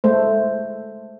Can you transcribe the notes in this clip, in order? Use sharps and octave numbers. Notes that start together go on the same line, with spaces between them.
G#3 A3 C5